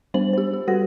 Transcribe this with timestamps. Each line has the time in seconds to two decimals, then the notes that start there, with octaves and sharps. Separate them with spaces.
0.14 G3 B3 D4 C5 F#7
0.33 G4 C5
0.54 G4
0.67 G3 F#4 A4 B4 F#5 A#6